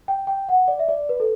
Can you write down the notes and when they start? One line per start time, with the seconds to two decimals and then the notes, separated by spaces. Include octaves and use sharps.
0.08 G5
0.27 G5
0.49 F#5
0.68 D5
0.79 E5
0.88 D5
1.09 B4
1.20 A4